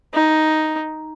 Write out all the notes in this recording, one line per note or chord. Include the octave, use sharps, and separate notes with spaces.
D#4